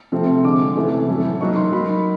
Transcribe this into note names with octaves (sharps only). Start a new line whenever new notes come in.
C3 F3 A3 C4
D3 F3 G#3 D6
C3 E3 A3 C#4
A2 F#3 A3 C#4 E4
F#3 A#3 D#4 C#6
C6
F#3 A#3 D#4 B5